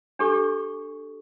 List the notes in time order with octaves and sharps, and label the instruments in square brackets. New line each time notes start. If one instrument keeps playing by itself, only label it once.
[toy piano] D4 G4 A4 C#6